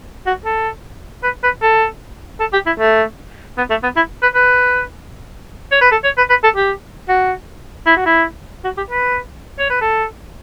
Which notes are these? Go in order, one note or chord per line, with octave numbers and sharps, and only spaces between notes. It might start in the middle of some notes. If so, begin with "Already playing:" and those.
F#4
A4
B4
B4
A4
A4
G4
E4
A3
B3
A3
B3
E4
B4
B4
C#5
B4
A4
C#5
B4
B4
A4
G4
F#4
E4
F#4
E4
F#4
G4
B4
C#5
B4
A4